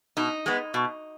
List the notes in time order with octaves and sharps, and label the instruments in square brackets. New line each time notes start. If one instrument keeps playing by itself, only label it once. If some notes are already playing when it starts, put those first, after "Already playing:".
[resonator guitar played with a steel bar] B2 D#4
G#3 B3
B2